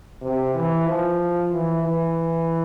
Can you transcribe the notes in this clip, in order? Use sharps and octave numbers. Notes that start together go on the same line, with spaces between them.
C3
E3
F3
E3
E3